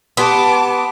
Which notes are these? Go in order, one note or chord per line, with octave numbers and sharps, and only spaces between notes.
B3 G4 A5 C6 D6